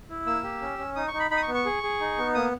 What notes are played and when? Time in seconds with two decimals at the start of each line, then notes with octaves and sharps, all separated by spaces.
0.09 E4
0.26 A#3 E6
0.43 G4
0.61 C#4
0.78 C#4
0.96 D#4 D#6
1.08 C#6
1.13 D#4
1.19 B5
1.31 D#4 B5
1.37 D#6
1.42 C#6
1.48 B3
1.54 C#6
1.65 G#4
1.83 G#4
2.00 D#4
2.18 B3
2.35 A#3 D#6